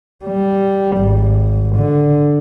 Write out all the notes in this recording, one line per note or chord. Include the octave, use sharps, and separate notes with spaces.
G3
G#1
D3